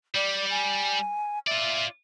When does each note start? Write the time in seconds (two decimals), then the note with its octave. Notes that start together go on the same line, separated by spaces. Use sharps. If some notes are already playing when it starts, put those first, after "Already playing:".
0.15 G3 D5
0.50 G#5
1.47 F4 D5 E5